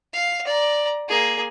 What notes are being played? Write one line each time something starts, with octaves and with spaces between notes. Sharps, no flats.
F5
D5 A#5
A#3 G#4